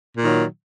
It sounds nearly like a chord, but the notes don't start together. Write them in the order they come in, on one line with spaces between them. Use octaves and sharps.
A#2 D#3 F#3